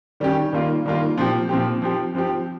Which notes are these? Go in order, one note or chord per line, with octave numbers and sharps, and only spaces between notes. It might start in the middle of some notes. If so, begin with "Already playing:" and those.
D#3 G3 C#4 G4
D#3 G3 A#3 F4
D#3 G3 A#3 F4
A#2 F3 C4 G4
A#2 F3 C4 G4
F3 C4 G4
F3 C4 G4